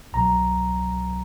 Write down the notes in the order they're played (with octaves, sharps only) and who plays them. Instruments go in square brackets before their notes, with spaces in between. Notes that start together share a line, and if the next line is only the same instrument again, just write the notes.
[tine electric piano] C2 B2 F#3 A#5